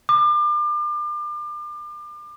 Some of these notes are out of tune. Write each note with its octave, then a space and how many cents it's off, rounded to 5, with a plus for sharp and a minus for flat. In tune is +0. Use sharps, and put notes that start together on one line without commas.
D6 +35